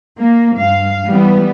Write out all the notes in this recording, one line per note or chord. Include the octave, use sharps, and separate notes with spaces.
A#3
G2 F5
E3 G3 B3